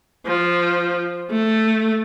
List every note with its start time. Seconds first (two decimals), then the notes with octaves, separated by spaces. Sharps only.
0.26 F3
1.31 A3